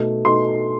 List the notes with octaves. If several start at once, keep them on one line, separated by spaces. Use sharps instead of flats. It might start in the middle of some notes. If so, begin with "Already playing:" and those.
Already playing: B2 A3 D#4
B2 A3 D#4 C6